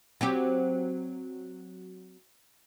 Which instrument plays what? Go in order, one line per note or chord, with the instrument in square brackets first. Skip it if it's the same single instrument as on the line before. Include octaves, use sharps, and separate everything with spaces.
[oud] F#3 C4 G4